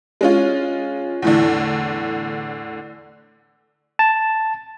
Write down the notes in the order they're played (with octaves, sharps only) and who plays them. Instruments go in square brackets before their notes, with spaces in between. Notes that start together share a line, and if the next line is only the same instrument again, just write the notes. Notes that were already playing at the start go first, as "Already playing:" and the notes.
[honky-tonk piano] G#3 C#4 F4
E2 A2 D3
[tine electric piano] A5